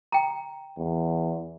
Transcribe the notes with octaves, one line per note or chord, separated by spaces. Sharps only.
G5 A#5
E2